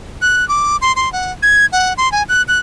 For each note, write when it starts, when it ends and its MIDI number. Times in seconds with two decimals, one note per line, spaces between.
0.22 0.47 90
0.49 0.77 86
0.81 0.94 84
0.96 1.11 84
1.13 1.32 78
1.43 1.66 92
1.72 1.93 78
1.97 2.11 84
2.12 2.23 80
2.29 2.42 90
2.48 2.59 90